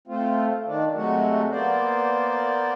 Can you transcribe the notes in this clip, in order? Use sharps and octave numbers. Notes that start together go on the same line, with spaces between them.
A3 C4 F4
D#3 D4
C3 F#3 G#3 A3 F#4
A#3 B3 C5 D5